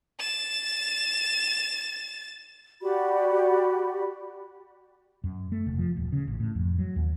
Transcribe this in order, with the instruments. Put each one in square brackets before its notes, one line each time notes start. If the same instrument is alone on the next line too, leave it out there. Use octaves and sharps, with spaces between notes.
[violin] A6 E7
[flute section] F#4 G4 D5 B5
[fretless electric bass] F#2
A3
F1
F3
D#1
C#3
A1
A2
F2
F#3
D#2